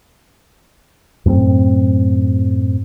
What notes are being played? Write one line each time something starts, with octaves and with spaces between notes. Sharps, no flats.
F#2 A2 A#3 C4